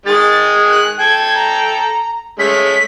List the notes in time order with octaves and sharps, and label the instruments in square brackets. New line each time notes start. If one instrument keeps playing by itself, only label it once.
[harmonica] D#3 G#3 G#4 [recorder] A6
[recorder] F#6
[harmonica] A4 G5 [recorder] G#6
[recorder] A#5
[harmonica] G#3 A3 C#4 [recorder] B6